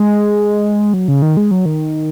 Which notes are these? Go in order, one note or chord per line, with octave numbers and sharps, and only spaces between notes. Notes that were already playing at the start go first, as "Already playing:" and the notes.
Already playing: G#3
F#3
C#3
D#3
G#3
F#3
D#3